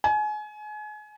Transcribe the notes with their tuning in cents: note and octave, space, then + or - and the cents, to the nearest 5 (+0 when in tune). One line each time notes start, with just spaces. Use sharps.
G#5 +30